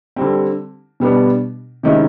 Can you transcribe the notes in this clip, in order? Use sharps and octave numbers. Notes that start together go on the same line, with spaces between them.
D3 G3 C4
B2 G3 B3 D4
C3 D#3 G#3 C#4 E4